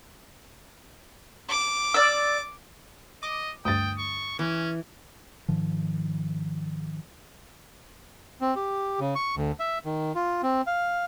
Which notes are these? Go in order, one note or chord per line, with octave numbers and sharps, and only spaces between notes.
D6
D5 E6
D#5 D6
D2 G2 G5 D#6 A6
C#6
E3 C#4
G#2 D#3 F3
C4
G4
C#3
C#6
D2
E5
D#3
F4
C4
F5